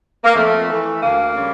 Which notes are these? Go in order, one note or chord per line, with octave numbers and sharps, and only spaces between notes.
A#3
F2 A3
E3 A3
D2 A#3
C#3 G3